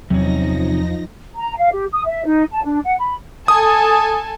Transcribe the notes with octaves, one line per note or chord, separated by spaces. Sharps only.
E2 C3 F3 F#3 C#4 D#4 A#6
A#5
F5
G4
D#6
E5
D#4
A5
D4
F#5
B5
A4 G#5 A5 D#6